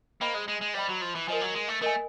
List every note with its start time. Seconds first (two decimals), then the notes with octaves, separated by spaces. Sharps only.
0.21 A#3 C5 D#5 G5 B5
0.34 G#3
0.48 G#3
0.61 G#3
0.74 G3 C5 D#5 G5 B5
0.88 F#3
1.01 F3
1.15 E3
1.28 F3 A#4 D#5 G#5
1.41 F#3
1.55 G#3
1.68 A3
1.82 A3 A#4 D#5 G#5